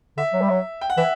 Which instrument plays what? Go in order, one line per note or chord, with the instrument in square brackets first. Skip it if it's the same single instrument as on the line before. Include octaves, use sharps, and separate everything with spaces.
[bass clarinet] D3 [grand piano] E5
[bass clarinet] F#3
G3
F#3
[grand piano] G5
F#5
[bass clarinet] E3 [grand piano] E5